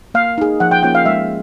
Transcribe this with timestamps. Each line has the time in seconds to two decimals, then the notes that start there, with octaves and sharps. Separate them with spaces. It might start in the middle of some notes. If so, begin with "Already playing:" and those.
0.14 A#3 F5
0.38 D#4 G#4
0.60 F3 F#5
0.71 G5
0.83 A#3 C#4 F4 G5
0.95 F5
1.05 G#3 E5